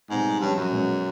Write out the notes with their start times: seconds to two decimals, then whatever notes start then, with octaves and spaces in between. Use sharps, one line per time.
0.10 G#2 B2 G3 C4
0.40 G2 A#2 F3 G#3 C#4
0.56 F#2
0.71 B2 G#3 C#4